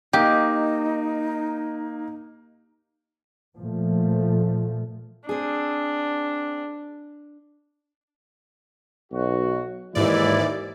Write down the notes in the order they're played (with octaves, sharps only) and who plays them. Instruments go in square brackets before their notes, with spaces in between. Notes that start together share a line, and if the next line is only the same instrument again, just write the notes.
[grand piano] A#3 D#5 [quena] D#4 [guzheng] G4
[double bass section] A#2 F3 A3
[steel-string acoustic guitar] C4 G#4 [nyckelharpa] D4
[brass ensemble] B1 F#4
[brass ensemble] D#2 E3 E4 [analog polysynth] G#2 D5